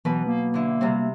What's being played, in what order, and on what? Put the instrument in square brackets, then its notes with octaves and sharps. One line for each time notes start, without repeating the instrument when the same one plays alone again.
[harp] B2 F#3 B4 [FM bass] E3
[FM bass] A#3
[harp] D3 E4
C3 G3 C4